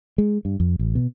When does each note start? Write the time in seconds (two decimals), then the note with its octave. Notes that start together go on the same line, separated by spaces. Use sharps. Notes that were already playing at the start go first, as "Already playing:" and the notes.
0.18 G#3
0.45 G2
0.60 F2
0.79 A1
0.95 B2